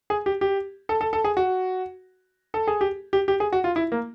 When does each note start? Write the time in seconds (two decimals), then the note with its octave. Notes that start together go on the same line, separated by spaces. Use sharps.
0.10 G#4
0.26 G4
0.41 G4
0.89 A4
1.01 A4
1.13 A4
1.24 G#4
1.37 F#4
2.54 A4
2.67 G#4
2.81 G4
3.13 G4
3.28 G4
3.40 G#4
3.52 F#4
3.64 F4
3.76 E4
3.92 A#3